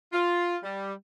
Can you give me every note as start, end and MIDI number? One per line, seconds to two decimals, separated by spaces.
0.13 0.56 65
0.63 0.92 55